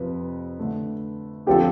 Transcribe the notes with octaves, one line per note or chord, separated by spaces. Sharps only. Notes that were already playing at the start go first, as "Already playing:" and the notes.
Already playing: F2 C3 F3 B4
D3 A3 D4
D3 F3 C4 F4 G4 A4